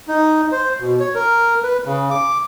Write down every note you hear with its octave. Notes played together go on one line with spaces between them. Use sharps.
D#4
C5
B2
C#5
A#4
B4
C#3
D6